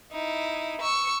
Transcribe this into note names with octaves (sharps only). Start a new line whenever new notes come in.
D#4 E4
C#6 E6